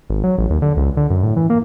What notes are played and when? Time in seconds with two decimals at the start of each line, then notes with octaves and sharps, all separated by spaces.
0.10 G#1
0.24 F#3
0.38 A1
0.50 D#2
0.62 D3
0.77 C#2
0.97 D3
1.10 F#2
1.23 A2
1.36 E3
1.50 A#3